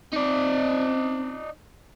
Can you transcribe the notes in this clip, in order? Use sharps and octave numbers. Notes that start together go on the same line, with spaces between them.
C4 D#4 D5